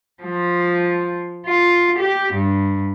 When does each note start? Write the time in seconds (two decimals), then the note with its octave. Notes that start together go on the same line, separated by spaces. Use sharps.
0.23 F3
1.46 F4
1.99 G4
2.33 G2